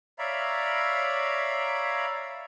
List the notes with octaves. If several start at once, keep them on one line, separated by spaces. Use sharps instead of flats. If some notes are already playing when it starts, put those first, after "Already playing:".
C#5 D5 E5 F5 A#5 B5